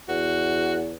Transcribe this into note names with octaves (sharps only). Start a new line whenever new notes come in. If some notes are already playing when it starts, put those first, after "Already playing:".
E2 F#4